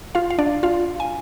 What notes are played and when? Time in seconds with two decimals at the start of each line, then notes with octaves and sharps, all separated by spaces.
0.15 F4 F5
0.30 F5
0.39 D4 D5
0.63 F4 F5
1.00 G#5